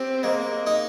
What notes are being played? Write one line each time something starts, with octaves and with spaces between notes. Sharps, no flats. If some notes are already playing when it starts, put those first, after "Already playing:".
Already playing: C4 G4
G#3 A#3
D#4